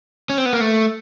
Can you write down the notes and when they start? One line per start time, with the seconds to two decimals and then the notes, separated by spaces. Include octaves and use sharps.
0.30 C#4
0.38 C4
0.46 B3
0.53 A#3
0.61 A3